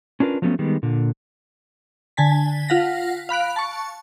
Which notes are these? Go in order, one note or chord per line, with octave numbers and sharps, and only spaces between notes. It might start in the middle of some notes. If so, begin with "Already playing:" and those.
C#4 D4 F4 A#4 B4
F3 F#3 A3 B3 C#4
D#3 G3 G#3 B3
A#2 D3
D3 G#5 A5 B6
F4 F5 F#5 A#6 B6
F5 B5 F#6 D7
A5 C#6